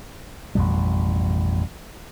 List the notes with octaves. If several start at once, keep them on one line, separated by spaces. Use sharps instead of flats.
A1 F2 B2 G3